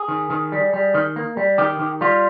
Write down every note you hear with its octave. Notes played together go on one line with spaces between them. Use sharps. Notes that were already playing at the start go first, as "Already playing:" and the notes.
Already playing: G#4
D#3
D#3
G3
G3
D#3
A#3
G3
D#3 G4
D#3
G3 F4